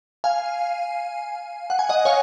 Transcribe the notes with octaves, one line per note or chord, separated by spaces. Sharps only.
F5 G#5
F#5
G#5
D#5 F#5
C#5 F5